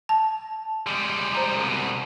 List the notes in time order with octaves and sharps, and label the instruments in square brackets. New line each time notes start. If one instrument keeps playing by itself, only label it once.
[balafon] A5
[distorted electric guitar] G3 G#3
[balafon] C5 A#5
[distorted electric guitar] C2 B2